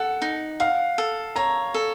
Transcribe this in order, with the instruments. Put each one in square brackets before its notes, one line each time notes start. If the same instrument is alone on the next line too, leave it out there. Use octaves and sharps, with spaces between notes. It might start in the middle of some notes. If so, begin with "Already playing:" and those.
Already playing: [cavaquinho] A4 [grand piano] F#5
[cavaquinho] D#4
[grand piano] F5 [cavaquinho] F#5
[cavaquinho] A4
[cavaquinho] C#5 [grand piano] A#5
[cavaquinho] A4